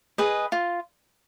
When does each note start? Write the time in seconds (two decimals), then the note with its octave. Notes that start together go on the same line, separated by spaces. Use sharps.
0.18 G#4 B4 D#5
0.52 F4